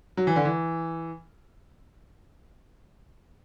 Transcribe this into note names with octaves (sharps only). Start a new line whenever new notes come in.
F#3
E3
D3
E3